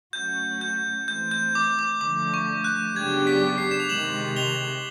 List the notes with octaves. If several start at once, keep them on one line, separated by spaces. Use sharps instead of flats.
F#3 A3 C#4 F#4 G6
G6
E3 A3 C4 G6
G6
D6
D6
D3 F3 A3 D6
C#6
F#6
C#3 F#3 B3 D4 G4 G#6
B6
C7
E7
F7
C3 D#3 G#3 E7 F#7
F7 G7